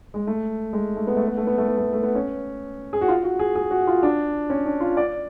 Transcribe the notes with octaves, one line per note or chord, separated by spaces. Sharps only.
G#3
A3
G#3
A3
B3
A3
B3
A3
B3
A3
B3
A3
A3
B3
C#4
G#4
F#4
F4
F#4
G#4
G#4
F#4
F4
D4
C#4
D4
F4
D5